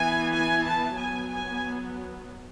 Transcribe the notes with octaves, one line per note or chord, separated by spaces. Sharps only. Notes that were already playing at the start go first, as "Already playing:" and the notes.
Already playing: E3 B3 G#5
G#5
A5
F#3 B3 G#5
G#5